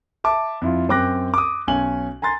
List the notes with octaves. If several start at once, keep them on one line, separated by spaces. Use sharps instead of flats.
E5 A5 D6
F2 E4 F4
F#2 C4 G5 D6 F#6 A#6
D6 D#6
B1 C#4 G#5 F#7
G#5 A#5 C6 A6